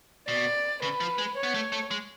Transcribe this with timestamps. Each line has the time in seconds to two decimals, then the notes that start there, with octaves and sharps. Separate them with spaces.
0.28 B2 D5
0.82 C#3 B4
1.00 F3
1.18 G#3
1.36 C#5
1.43 B3
1.54 A3
1.72 A3
1.91 G#3